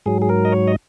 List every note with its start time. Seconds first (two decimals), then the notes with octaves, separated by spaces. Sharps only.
0.06 G#2 F#3 G#4
0.22 G#4
0.29 A#4
0.45 D#5
0.52 C#5
0.68 D#5